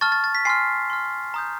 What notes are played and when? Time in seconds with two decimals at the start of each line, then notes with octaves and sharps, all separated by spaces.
0.01 A5 C#6 F6 A6
0.12 A6
0.24 A6
0.35 B6
0.45 G#5 C6 F6 C7
0.90 C6 F6
1.34 A#5 D#6 G6